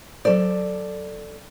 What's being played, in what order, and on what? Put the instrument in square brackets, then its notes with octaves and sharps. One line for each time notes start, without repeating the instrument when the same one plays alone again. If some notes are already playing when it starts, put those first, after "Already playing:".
[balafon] F#3 C5 [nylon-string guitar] A4 D5